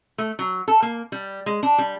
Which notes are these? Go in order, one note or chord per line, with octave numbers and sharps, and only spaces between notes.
A3
F#3
A4
A#3
G3
G#3
D4
G3